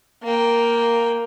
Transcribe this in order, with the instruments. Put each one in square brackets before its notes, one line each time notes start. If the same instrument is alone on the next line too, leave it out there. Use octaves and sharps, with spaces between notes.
[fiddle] A#3 G5